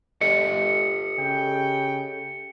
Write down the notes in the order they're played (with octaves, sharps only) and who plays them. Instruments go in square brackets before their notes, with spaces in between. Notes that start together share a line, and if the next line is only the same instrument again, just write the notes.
[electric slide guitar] G4 A4 D#5 [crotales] C#7
[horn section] C#3 G5